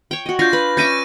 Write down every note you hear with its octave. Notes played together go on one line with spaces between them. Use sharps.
C#5 G5
F#4 D#5
D4 F4 C#6 G6 A#6
B4
C#4 E5 D6 G6 A#6 D#7